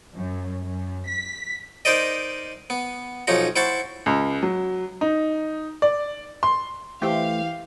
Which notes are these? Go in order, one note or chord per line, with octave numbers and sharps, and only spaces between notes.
F#2
F#2
B6
D#4 A#4 C5 D5 D#5
B3
B1 F3 C#4 D#4 A#5
E4 C5 F#5 A5 C#6
C#2
F#3
D#4
D5
C6
E3 A3 G4 C5 F5 G5